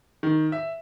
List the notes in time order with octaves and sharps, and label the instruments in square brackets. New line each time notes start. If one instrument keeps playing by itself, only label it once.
[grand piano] D#3
E5